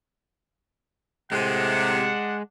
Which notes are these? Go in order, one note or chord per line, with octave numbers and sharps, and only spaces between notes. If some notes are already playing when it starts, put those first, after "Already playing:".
A2 C3 G#3 D4 F#5